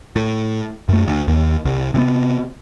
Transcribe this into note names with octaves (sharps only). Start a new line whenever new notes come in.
A2
F#2 A3
D2
D#2
C2
C3 E3 B3